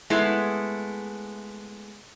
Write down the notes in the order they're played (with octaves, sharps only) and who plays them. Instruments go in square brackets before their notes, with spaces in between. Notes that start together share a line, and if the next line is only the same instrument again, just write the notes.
[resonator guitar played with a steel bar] G#3 A3 B3 E4